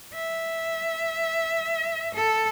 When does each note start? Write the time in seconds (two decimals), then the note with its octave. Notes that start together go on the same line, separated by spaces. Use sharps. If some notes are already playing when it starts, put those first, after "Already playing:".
0.14 E5
2.14 A4